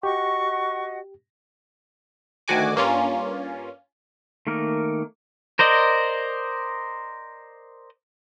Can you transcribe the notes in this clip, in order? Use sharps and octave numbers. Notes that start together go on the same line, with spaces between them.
F#4 G4 D#5 F#5 C#6
D2 D#3 F#4 G#5 D6
G2 A#3 C#4 F4
D#3 A3 A#3 A#4
A#4 C5 D5 D#5